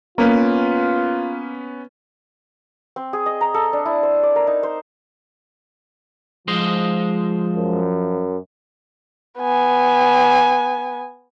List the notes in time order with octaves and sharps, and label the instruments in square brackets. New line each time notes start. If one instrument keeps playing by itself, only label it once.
[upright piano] A#3 [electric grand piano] B3 C#4 B4 [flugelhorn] F4
[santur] C4
G#4
D#5
A#5
A4
D4
E4
C5
D5
A#4
D#4
C5
[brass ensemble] F3 [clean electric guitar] G#3 C5 D#5
[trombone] F#2
[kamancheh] B3 G#5